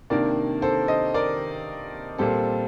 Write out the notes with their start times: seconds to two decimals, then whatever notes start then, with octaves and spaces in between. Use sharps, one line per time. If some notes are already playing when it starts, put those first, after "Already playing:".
0.10 C3 D#3 A#3 D4 A#4 D5
0.62 A4 C5
0.88 C5 D#5
1.14 A#4 D5
2.18 A#2 G3 C4 A4 C5